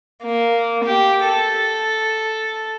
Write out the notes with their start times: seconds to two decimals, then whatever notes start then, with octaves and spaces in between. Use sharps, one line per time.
0.23 A#3
0.85 G4
1.28 A4